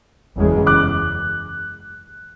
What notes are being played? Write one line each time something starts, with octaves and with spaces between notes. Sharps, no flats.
F#1 E2 C#3 G#3
D6 F#6